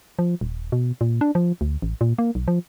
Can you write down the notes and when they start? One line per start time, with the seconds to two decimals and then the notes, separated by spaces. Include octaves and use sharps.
0.19 F3
0.41 D#1
0.72 B2
1.01 A#2
1.21 D4
1.35 F3
1.61 D2
1.82 A1
2.01 A#2
2.18 A#3
2.35 B1
2.48 F3